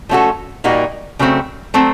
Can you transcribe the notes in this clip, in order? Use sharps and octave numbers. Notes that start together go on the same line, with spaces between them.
F3 A3 C#4 F#4 A4
A#2 G3 A#3 D#4 F#4
C#3 F#3 A3 C4
F#3 A3 C4